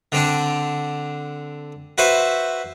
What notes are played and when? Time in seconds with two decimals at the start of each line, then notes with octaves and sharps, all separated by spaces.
0.12 D3 C4 D4
1.98 F#4 B4 C5 E5